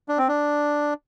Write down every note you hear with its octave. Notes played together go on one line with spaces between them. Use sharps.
D4
C4
D4